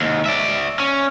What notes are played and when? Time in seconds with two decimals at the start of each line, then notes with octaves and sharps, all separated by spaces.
0.01 D#2 G#2
0.26 D5 E5
0.80 C#4